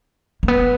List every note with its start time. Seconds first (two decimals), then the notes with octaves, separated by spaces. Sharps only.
0.43 A#3
0.48 B3